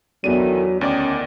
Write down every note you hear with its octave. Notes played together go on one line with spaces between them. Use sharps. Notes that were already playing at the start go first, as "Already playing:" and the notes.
E2 D#3 F#3 D4 E4 A4 D#7
D2 D#3 C#4 D5 D6